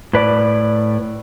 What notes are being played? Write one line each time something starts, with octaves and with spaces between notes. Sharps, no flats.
A2 B4 D5